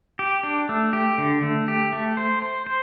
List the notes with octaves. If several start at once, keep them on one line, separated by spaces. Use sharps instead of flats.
G4
D4
A3
G4
D3
A3
G4
A3
C5
C5
C5